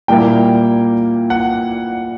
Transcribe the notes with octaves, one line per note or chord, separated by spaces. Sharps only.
A#2 G3 A#3 E4 G5
F#5